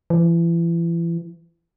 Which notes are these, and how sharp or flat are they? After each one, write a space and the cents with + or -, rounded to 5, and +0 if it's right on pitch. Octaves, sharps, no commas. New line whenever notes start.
E3 +35